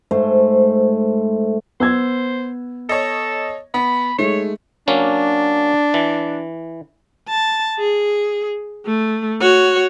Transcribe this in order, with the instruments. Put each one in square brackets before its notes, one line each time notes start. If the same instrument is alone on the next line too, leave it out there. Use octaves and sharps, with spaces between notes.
[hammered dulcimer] G#2 A3 C5
[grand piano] B3 E6 G#6 [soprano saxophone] C5
[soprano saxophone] A4 [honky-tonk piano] C#5 D#5
[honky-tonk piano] B3 [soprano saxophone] B5
[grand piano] G#3 D#4 [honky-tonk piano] A3 [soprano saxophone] C#5
[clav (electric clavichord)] F#3 A#3 C#4 [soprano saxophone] D4
[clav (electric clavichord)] E3
[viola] A5
G#4
A3
F#4 C#5